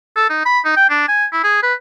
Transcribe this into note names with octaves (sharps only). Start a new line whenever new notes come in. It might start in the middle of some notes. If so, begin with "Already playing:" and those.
A4
D#4
B5
D#4
G5
D4
G#5
E4
G#4
B4